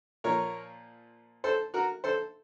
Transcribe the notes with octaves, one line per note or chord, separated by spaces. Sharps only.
A#2 F3 A#4 C#5
A4 C5
F#4 A#4
A4 C5